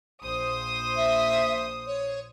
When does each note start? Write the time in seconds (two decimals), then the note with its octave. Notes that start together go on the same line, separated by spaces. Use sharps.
0.22 A#1 C5 D#6
0.96 E5
1.87 C#5